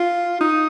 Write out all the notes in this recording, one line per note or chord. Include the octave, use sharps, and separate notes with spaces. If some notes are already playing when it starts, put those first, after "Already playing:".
Already playing: F4
D#4